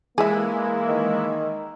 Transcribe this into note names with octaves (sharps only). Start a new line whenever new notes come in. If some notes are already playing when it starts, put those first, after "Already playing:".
E3 G#3 A#3 E4 G#4 E5
D#3